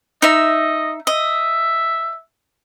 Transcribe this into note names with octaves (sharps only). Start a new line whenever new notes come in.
D#4 D#5 E5
D#5 E5